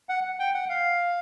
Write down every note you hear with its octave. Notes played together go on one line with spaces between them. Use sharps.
F#5
G5
F#5
F5